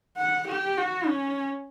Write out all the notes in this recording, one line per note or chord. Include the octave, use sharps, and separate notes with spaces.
F#5
G4
F#4
C#4